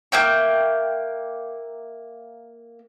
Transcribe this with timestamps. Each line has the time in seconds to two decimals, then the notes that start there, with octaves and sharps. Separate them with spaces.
0.12 A#3 E5 G5 C#6